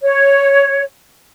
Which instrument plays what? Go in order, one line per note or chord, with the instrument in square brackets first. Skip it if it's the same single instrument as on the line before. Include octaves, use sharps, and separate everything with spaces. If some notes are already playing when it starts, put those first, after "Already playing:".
[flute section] C#5